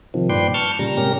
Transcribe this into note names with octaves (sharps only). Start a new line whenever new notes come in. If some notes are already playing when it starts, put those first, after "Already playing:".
C3 D#3 F3
G2 A#2 B4 D5 G5 C6
A5 C#6 F6 G6 A6
A#2 C#3 G3 A#5
G#2 C3 C#4 G4 A#4 A#6